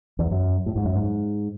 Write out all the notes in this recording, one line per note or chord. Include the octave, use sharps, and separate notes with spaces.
E2
F#2
A2
G#2
F#2
G#2